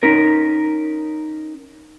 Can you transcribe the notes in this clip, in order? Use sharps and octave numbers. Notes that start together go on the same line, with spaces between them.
C#4 D#4 A#4